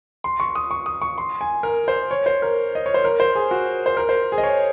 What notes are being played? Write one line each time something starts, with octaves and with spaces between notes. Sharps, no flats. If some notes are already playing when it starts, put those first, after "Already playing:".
C6
C#6
D#6
C#6
D#6
C#6
C6
G#5
A#4
C5
C#5
C5
A#4
D#5
C#5
C5
A#4
C5
G#4
F#4
C5
A#4
C5
G#4
D#5
C#5